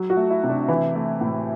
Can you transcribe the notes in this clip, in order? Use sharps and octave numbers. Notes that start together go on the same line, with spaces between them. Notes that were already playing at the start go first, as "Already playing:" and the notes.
Already playing: F#3
F#4
A3
E4
C3
D4
E3 E4
A3
A2